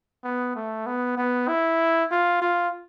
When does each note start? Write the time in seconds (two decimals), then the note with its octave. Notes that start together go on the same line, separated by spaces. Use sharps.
0.24 B3
0.55 A3
0.86 B3
1.17 B3
1.48 E4
2.11 F4
2.41 F4